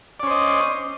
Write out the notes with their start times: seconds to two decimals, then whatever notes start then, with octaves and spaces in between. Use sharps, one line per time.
0.20 D5
0.23 C#4
0.27 C5
0.30 D#5